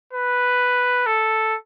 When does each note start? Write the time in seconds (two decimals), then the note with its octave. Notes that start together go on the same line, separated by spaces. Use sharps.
0.13 B4
1.06 A4